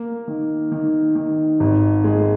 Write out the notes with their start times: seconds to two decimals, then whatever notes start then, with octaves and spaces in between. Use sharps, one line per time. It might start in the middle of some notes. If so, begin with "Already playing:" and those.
Already playing: A#3
0.28 D#3
0.72 D#3
1.15 D#3
1.60 G#1
2.04 G#3